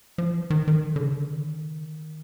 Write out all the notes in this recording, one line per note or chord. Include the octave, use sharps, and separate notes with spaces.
F3
E3
D#3
D#3
D3
D3
C#3
D3
D#3